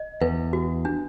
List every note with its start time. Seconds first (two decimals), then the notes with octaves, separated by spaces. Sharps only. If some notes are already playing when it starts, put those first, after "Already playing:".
Already playing: D#5
0.21 E2 B4
0.53 F#4
0.85 D4